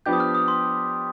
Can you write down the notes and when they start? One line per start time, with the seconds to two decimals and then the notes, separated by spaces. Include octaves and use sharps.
0.06 F3 B3 D4 G4 G6
0.13 D#6
0.20 F6
0.35 D#6
0.48 C6